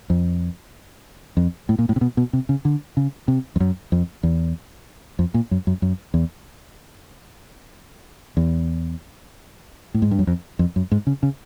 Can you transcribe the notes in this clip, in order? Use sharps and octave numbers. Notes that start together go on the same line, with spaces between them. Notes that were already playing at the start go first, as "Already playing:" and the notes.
F2
F2
A2
A#2
A2
C3
B2
B2
C3
C#3
D3
C#3
C3
F2
F#2
F2
E2
F2
A#2
F#2
F#2
F#2
E2
E2
A2
G#2
G2
F#2
F2
F2
F#2
G#2
C#3
C#3